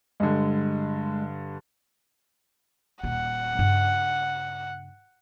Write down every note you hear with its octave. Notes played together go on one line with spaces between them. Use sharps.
G2 D3 G#3
D#1 F4 F#5
G2 C#3